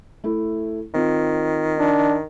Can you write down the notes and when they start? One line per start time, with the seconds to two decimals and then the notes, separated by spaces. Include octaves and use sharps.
0.24 A3 E4
0.94 D#3 C4 F4
1.79 D4